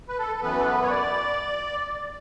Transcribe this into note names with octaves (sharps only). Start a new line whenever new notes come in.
B4
A4
A4
F#2 E3 B3 B4
A4
B4
C#5
D5